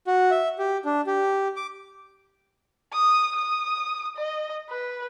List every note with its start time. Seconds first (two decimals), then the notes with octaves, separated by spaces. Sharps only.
0.07 F#4
0.31 E5
0.58 G4
0.85 D4
1.07 G4
1.56 D6
2.93 D#6
3.35 D#6
4.17 D#5
4.69 B4